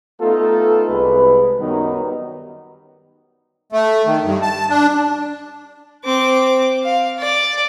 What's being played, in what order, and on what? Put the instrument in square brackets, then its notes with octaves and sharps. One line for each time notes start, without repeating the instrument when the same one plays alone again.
[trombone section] A3 B3 D#4 F4 A4
C2 G#3 B4
F#2 D#3 F#3 G3 B3 D#4
[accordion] A3
D#3
G2
A5
D4
[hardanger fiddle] C4 D6
F5
D5